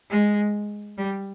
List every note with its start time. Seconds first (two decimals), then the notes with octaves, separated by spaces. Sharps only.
0.10 G#3
0.97 G3